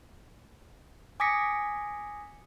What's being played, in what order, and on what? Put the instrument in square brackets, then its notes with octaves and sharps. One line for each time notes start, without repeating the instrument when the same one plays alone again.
[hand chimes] G#5 D6 D#6 A#6 B6 C#7